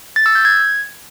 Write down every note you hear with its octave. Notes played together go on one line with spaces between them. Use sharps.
A6
E6
G6
G#6